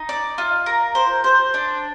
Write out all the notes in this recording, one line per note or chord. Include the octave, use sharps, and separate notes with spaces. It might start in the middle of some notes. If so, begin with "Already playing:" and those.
Already playing: D#4
D5
F4
A#4
C5
C5
D4